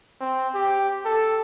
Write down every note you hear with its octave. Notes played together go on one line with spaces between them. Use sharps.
C4
G4
A4